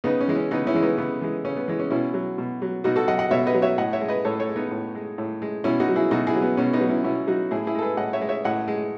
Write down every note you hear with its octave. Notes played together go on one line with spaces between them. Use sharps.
C#3 B3 D#4
C#4
E3 G#3
C#4
C#3 B3 D#4
C#4 E4
E3 G#3
B3 D#4
C#3 B3
E3 G#3
C#3 C#4
B3
E3 G#3 B3
C#4
B2 C#4 E4
F#3
B2
F#3
B2 D#4 F#4
F#4 A4
F#3 D#5 F#5
D#5 F#5
B2 C#5 E5
B4 D#5
F#3
C#5 E5
A2 D#5 F#5
C#5 E5
G#3
B4 D#5
A2 A4 C#5
A4 C#5
G#3
B3 D#4
A2
G#3
A2
G#3
B2 C#4 E4
D#4 F#4
F#3
E4 G#4
B2 D#4 F#4
E4 G#4
F#3
B3
B2 C#4
B3 D#4
F#3
C#4 E4
B2 C#4 E4
F#3 D#4 F#4
A2 E4 G#4
E4 G#4
G#3 A4
G#4 B4
A2 D#5 F#5
C#5 E5
G#3
C#5 E5
A2 D#5 F#5
G#3